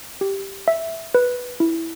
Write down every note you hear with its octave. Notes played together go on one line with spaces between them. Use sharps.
G4
E5
B4
E4